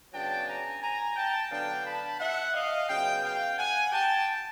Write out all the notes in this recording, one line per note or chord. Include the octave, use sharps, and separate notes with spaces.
C#3 F#3 B3 D4 G5 A5
G#5 A#5
G#5 A#5
G5 A5
D3 F#3 B3 D4 F5 G5
A5 B5
E5 F#5
D#5 F5
C#3 F#3 B3 F5 G5
F5 G5
F#5 G#5
G5 A5